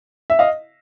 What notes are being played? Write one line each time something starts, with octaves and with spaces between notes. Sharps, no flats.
E5
D#5 F5